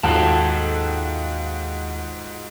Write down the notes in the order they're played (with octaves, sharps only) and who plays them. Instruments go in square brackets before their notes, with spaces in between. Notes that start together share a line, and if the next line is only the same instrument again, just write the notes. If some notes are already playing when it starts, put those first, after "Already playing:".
[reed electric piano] D#2 [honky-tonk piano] G#2 F4 F#4 [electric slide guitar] A4 G5 A5